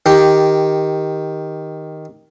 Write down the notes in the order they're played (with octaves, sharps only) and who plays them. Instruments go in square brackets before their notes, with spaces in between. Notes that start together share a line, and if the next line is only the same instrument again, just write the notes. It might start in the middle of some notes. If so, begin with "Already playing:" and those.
[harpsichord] D#3 G4